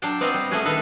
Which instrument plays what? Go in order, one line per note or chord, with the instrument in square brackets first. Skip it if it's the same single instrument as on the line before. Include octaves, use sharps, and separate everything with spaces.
[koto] F#3 D4 F5 G5 A5
B3 C4 D5 D#5 F5
G3
A3 C#4 F#4 G#4
D#3 A3 A4 B4 D#5